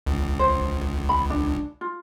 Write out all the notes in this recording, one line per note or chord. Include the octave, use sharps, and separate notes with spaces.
C#2
C5
B5
D4
F4